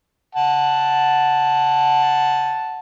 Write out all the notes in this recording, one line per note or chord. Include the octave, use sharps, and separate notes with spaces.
F#5 A5